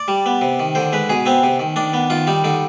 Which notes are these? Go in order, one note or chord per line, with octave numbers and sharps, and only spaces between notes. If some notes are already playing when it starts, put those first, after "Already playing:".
Already playing: D5
G3
B3
C3
D#3
D3 C5
G#3 B4
B2 G#4
B3 C4
C3
D#3
D#3 D4
B3
D#3 F4
G3 D#4
D3 D#4